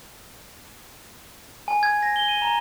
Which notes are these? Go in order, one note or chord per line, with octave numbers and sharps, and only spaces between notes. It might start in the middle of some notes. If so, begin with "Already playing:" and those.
G#5
G#6
A#6
G7
D#7
A#5